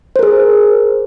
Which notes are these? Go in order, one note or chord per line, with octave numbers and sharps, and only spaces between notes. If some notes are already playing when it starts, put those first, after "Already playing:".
G#4 A#4 C5